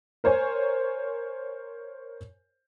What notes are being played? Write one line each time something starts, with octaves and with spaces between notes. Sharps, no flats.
A#4 C5 C#5 G#5